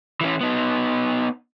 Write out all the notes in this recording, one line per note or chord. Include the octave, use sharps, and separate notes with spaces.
E3 C#4
B3 D#4